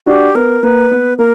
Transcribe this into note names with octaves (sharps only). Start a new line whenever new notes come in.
D4 F#4 G4
B3 A#4
A#3 B4
B3
A#3 A#4